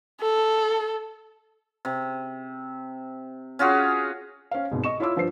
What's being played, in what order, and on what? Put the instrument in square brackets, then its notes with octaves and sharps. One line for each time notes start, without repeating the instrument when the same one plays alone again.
[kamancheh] A4
[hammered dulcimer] C3
C#4 F4 F#4 G#4
[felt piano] C#4 C5 F5
C2 G#2 B2
D#5 C#6 E7
E4 F4 C#5 C6 D6 E6
G2 F3 F4 B4 C5 C7